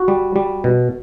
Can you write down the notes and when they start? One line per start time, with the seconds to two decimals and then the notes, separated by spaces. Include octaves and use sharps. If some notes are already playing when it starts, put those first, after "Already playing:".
Already playing: F#4
0.08 G3
0.36 G3
0.64 B2